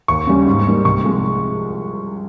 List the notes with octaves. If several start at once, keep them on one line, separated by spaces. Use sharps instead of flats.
D#2 C#6
C#3 G3 C#4
G#2
G3 A#3 D#4
C2 C#6
C3 F3 G#3